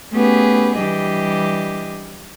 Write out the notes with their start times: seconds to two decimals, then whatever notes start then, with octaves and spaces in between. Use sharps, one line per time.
0.13 A3 B3 C#4 G4 G#4 B4
0.75 E3 G3 D4 G4 D#5